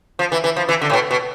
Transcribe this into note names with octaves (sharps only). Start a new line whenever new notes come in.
F3
E3
E3
F3
E3
D3
A2
B2
B2